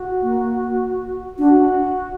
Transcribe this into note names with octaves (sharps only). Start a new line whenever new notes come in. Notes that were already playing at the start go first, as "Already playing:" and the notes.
Already playing: F#4
A#3
D4 F#4